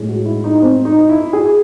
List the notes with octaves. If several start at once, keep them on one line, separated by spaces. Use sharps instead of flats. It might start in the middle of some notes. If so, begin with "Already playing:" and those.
Already playing: A2 G#3
F#4
E4
D#4
C4
D#4
E4
G#4